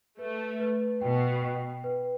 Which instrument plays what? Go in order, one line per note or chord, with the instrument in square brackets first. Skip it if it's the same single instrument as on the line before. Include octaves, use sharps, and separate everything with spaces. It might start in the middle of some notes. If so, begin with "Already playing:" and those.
[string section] A3 [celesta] B4
[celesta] B4
[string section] B2 [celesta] G5
[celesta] G5
B4